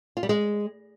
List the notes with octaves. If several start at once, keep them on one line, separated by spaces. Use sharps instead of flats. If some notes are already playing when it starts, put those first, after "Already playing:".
F4
G3
G#3